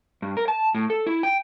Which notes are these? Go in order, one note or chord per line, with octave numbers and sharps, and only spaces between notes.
G2
A#4
A5
A2
A4
E4
G5